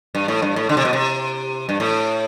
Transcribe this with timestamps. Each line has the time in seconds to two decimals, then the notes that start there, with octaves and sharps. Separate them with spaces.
0.15 G2
0.28 A2
0.42 G2
0.56 A2
0.69 D3
0.77 C3
0.85 B2
0.93 C3
1.69 G2
1.80 A2